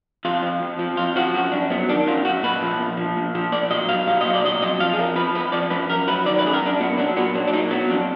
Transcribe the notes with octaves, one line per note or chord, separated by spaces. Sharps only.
F2 F4
F3
F2
F3
F2 F4
F3 F#4
F#2 F#4
F#2 D4
F#3 B3
D#3 D4
F#2 F4
F#2 F#4
A#2 B4
F3
A#2
F3
A#2
F3
A#2 D5
F#3 D#5
A#2 F5
F#3 F5
A#2 D#5
D5
F#3 D#5
F2 D#5
F3 F5
G#4
F2 A#4
F3 B4
F2 B4
F3 D5
F#2 B4
F#2 A#4
F#3 B4
D#3 D5
B4
F#2 G#4
A#4
F#2 D4
A#2 B3
F#3 D4
A#2 B3
F#3 D4
D4
A#2 D#4
F#3 B3
F2 D4